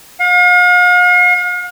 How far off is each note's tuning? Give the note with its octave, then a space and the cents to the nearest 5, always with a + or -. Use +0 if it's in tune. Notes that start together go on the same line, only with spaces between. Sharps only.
F5 +45